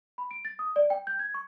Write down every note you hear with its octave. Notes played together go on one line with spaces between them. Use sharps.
B5
D7
A6
D#6
D5
G5
G6
G#6
C#6